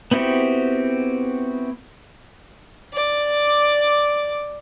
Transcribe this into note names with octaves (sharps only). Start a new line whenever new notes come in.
B3 C4 E4 F#4 G4
D5 D6